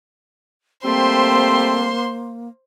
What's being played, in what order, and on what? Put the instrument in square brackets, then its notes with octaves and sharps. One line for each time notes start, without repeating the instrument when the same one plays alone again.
[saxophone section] G3 A3 C4 [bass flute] A#3 [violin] C5 C6